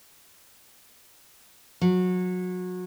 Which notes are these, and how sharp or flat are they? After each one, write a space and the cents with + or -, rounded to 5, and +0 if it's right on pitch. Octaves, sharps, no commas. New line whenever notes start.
F#3 -25